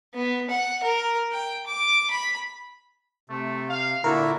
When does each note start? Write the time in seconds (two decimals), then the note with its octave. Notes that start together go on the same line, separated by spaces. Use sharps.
0.14 B3
0.50 F#5
0.83 A#4
1.32 G5
1.66 D6
2.10 B5
3.30 C3 A3
3.69 F5
4.04 A#2 D3 E4 F#4 A#4